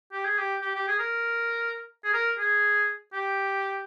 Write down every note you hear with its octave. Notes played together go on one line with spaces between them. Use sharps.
G4
G#4
G4
G4
G4
G#4
A#4
G#4
A#4
G#4
G4